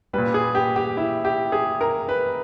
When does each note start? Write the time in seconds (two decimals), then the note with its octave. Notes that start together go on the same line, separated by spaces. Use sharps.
0.13 A#2 G3 B4
0.34 G#4
0.55 G4
0.76 G4
0.97 E4
1.25 G4
1.52 G#4
1.81 A#4
2.09 B4